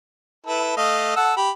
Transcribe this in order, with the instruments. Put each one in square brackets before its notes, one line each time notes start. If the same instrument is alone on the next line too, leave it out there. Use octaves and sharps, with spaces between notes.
[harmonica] E4 A4 B4
A3 D#5 F5
A4 F#5 E6
G4 B5